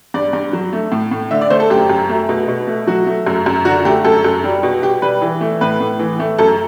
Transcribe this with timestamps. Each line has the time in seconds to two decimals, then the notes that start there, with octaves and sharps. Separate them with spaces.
0.14 G2 D5
0.33 G2
0.53 F#3
0.73 A3
0.92 A2
1.11 A2
1.31 D3 E5
1.41 D5
1.50 A3 C5
1.60 A4
1.70 F#2 G4
1.89 F#2
2.09 A3
2.29 B2
2.48 B2
2.67 A3
2.87 F#3 F#4
3.07 A3
3.27 F#2
3.46 F#2
3.65 D3 F#4
3.85 A3 G4
4.05 F#2 A4
4.24 F#2
4.44 G3
4.63 B2
4.83 B2 G4
5.02 G3 B4
5.22 E3
5.41 A3
5.61 A2 B4
5.80 A2
5.99 E3
6.20 A3
6.39 F#2 A4